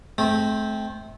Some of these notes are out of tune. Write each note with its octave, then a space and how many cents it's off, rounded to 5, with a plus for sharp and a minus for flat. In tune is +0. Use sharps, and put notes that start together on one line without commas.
A3 -35 C4 +0